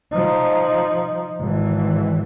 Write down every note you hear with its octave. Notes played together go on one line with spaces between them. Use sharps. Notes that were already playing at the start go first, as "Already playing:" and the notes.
F3 D#4
G#1 E3